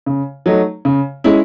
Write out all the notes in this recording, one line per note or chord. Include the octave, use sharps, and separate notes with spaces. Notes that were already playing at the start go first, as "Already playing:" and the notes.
C#3
F#3 A3 D#4
C#3
G#3 C#4 E4